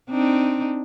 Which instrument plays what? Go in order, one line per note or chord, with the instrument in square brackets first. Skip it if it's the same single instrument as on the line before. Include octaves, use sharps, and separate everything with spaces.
[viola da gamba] C4 D4 D#4